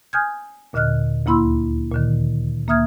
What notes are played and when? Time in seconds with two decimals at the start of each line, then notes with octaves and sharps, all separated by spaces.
0.13 G#5 D#6 F6 G6 G#6
0.73 D#2 A#2 D3 D#5 F6 F#6
1.26 D2 A#3 E4 B5 C6 E6
1.92 A#2 D3 D#3
2.67 D2 A#3 E5 D#6 F6 G#6